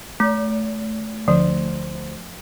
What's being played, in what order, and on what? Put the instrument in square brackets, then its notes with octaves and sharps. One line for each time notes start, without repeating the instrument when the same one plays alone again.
[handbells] A3
[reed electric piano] D2 C5 [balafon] F3